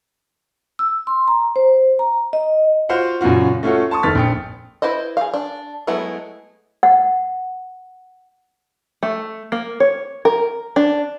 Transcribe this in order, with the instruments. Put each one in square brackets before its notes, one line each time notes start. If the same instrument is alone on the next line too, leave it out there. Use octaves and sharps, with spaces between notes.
[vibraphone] E6
C6
A#5
C5
A#5
D#5
[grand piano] F4 F#4 C5 F5 F#5
F#2 A#2 C#3 F4 F#4
A3 C#4 F4 F#4 A4
A5 C6 C#6 D#6
F#1 D#2 A4 F6 A6 B6
A#1 G5 C#7
[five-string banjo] E4 B4 C5 D#5
G#4 F5
D4
F#3 G#3 A3 B3 E4
[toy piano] F#5
[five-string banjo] A3
A#3
C#5
A#4
D4